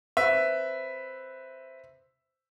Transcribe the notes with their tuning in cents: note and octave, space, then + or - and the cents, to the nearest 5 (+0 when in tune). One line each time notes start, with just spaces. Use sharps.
C4 +0 B4 +0 E5 +0